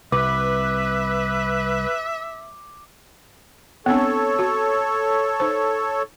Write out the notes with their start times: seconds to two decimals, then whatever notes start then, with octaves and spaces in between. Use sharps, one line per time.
0.12 C2 B4 E5 D6
3.86 B3 C4 D4 A4 C#5
4.39 F#4
5.40 D#4 C5